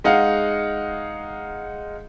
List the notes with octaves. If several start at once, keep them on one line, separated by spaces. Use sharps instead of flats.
G#3 D#4 F5 F#5